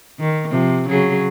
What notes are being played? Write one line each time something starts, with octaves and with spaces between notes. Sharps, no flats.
D#3
C3 F3
C#3 F#3 G#4